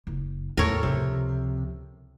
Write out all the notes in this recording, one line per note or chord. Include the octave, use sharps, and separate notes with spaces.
F#1
E2 A2 A4 A#4 C#5
C#2 C3 F3